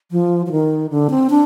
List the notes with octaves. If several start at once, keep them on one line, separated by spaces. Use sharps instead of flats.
F3
F3
D#3
D3
C4
D4